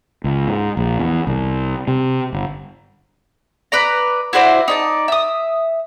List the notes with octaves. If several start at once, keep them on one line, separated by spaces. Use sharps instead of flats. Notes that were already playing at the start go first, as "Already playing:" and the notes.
C#2
G#2
A#1
E2
C2
C3
G1
B4 D5 A#5
E4 F#4 C5 D5
D#4 D5 A5
E5 D#6